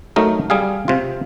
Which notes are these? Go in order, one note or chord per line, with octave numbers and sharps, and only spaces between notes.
F#3 A3 D#4 A#4
G3 G#4 F5
C3 F4